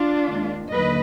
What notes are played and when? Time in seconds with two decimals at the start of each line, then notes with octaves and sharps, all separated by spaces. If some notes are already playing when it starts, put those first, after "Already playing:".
Already playing: D4 F4
0.27 D#2 D#3 G#3
0.71 D#2 D3 F#3 A#3 B4 D#5